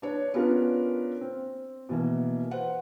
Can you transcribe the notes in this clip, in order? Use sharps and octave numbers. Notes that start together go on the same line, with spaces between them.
D4 B4 C#5
B3 C#4 D4 F4 A#4
C4
B2 E3 A#3
B4 C5 F#5